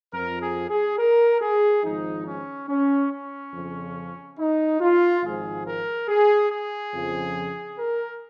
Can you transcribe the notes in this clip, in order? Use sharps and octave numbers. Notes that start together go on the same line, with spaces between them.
F2 F3 A#4
G#4
G#4
A#4
G#4
G#1 G#2 F3 D#4
C#4
C#4
C#4
F2 C#3 F3
D#4
F4
G#1 G#2 F3 G#4
A#4
G#4
G#4
F2 C#3 F3
A#4